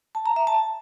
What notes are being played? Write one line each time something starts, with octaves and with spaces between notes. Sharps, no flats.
A5
A#5
E5
A5